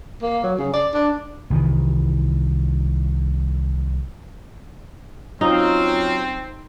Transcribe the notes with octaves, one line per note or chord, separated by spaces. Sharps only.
A#3
F#3
C#3
D5
D4
C2 D#3 E3
F#3 C4 C#4 D#4 F4